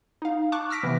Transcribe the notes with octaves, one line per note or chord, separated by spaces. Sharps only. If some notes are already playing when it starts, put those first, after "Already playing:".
D#4 F5
A5 C#6 D6 F#6
E6 F6 A#6 B6 D7
C3 E3 B3